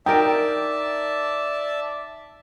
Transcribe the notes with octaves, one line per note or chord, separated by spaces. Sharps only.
D#4 A#4 D5 E5 G5 A5